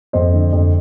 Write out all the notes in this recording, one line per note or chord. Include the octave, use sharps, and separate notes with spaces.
F2 C5 D#5
D3
F2